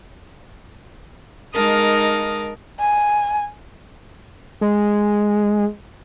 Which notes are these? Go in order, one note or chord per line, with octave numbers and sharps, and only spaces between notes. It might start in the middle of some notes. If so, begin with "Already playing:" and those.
G#3 D#4 A#4 F5 A5 D#6
G#5
G#3